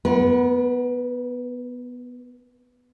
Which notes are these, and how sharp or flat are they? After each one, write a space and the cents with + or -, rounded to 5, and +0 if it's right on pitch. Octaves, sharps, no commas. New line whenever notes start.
B3 +0 A#4 +45